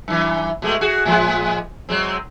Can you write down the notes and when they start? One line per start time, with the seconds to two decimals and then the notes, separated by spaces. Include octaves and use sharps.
0.08 F#2 E3
0.62 B2 G#3 A3
0.81 F#4 G#4
1.05 A2 F3 G#3
1.89 F#3 G#3 C4